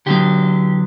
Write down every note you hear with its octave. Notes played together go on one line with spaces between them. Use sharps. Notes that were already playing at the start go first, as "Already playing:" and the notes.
D3 F#3 B3 G4